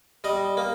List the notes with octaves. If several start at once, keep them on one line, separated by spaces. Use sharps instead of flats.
G3 D#5
A#3